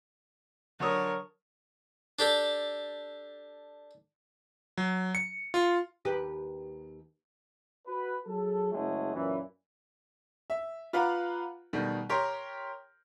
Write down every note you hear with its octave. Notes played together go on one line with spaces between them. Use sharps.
D3 F#3 A#4 C#5 D#6
D4 G4 A4
F#3
C#7
F4
D#2 G4 B4
F#4 B4
F#3 G#4 A4
F#1 F#3 G#3 A3
F#2 A#2 E3
E5
F4 B4 F5 F#5 A#5 D6
B2 D#3 G3 A3
G4 A#4 C#5 A#5 C6